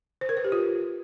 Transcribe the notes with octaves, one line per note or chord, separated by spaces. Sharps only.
C5
A#4
B4
G4
F4